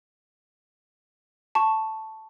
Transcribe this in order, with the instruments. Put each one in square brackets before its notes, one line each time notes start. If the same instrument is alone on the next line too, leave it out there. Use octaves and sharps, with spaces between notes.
[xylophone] A5 C#6